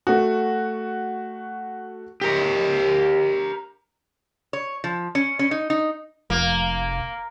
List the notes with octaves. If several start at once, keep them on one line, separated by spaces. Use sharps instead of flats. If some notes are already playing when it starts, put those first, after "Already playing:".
A3 F#4
G4 A#4
C#5
F3
C#4
C#4
D#4
D#4
F1 A#3